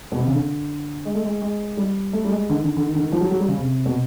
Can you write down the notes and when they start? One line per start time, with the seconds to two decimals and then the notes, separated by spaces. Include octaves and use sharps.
0.12 B2
0.19 C3
0.26 C#3
0.33 D3
1.05 G#3
1.15 A3
1.25 G#3
1.42 G#3
1.77 G3
2.13 A3
2.25 G3
2.31 G#3
2.49 D3
2.56 D#3
2.64 D3
2.77 D3
2.86 D#3
2.95 D3
3.03 D#3
3.12 F3
3.21 F#3
3.31 F#3
3.40 G3
3.48 C#3
3.58 C3
3.86 B2